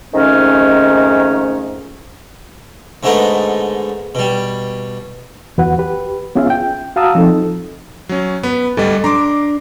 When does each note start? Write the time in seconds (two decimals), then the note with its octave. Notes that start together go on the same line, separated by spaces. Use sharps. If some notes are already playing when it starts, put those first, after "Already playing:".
0.14 F2 G#2 D#3 A3 C#4
3.03 G#2 D3 A3 B3 D#4
4.15 B2 G3
5.58 E2 F#4 B4 F#5
5.79 G4 B4
6.35 B3 C#4 F4 G#4 E5 F5
6.50 G5
6.96 F#4 F5 A5 A#5 D#6 E6
7.15 F3 C4 D#4 A4
8.09 F#3 C#4
8.43 B3 B4
8.77 D2 G3 A4 D#5
9.04 D4 A#5 C6 D6